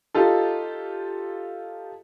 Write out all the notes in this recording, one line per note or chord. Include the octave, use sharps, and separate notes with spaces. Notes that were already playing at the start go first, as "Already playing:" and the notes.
D#4 F4 G4 A4